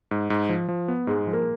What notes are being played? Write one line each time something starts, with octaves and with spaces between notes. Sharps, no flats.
G#2
G#2
F3
F3
B3
G#2 G#3
F3
A#3